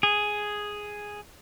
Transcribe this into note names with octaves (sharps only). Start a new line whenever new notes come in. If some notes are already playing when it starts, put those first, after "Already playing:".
G#4